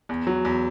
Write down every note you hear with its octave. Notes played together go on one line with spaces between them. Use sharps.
E2
F#3
E2